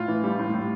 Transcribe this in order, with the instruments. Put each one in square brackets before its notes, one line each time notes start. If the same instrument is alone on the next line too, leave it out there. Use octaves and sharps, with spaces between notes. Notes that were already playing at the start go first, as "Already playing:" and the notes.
Already playing: [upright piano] A2 F4
E3
G3
A2
A2